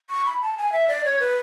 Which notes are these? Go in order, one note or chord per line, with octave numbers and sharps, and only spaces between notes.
C#6
B5
A5
G#5
E5
D5
C#5
B4